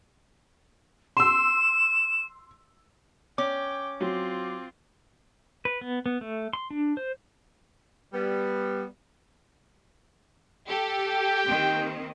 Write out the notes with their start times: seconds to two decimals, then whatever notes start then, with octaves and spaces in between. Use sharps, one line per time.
1.17 C6 E6 E7
3.38 C#4 G5 D6
4.00 F#3 C4 F4
5.65 B4
5.81 B3
6.06 B3
6.21 A3
6.53 C6
6.70 D4
6.97 C5
8.13 G3 B3
10.68 G4 A4
11.06 G5
11.46 D#3 A#3 C4